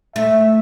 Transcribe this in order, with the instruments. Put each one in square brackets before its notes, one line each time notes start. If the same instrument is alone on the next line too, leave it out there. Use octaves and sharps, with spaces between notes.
[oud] A3 [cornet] E5